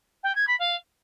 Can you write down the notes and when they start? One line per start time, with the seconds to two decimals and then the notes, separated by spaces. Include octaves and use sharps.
0.23 G5
0.35 G#6
0.47 B5
0.59 F5